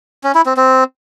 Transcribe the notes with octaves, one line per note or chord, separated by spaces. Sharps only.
C#4
E4
C4
C4